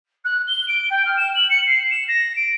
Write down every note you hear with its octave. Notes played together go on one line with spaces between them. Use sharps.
F#6
G7
D7
G5
F6
E7
F#7
C#7
C7
E7
A#6
D7